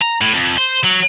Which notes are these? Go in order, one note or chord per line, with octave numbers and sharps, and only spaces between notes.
A#5
A2
F2
C5
F#3